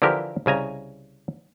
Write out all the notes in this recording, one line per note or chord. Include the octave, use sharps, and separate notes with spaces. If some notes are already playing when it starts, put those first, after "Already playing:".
D3 E3 F3 E4 G4 A#4
C2 C#3 G#5 A#5